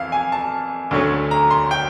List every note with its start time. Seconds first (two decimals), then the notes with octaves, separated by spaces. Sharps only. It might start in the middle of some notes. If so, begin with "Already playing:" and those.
Already playing: F2 E3 F5
0.12 G#5
0.32 A5
0.91 D2 D3 F#3 A3 C#4
1.31 A#5
1.51 C6
1.71 G5